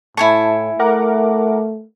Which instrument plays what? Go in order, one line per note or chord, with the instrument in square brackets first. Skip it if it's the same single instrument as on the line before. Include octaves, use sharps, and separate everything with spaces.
[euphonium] A2 [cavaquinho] E4 G#5 C#6 [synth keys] A5
[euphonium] A3 [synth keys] A#4 F#5 D6